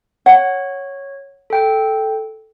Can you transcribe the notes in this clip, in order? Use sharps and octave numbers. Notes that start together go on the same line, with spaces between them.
C#5 F#5
A4 G5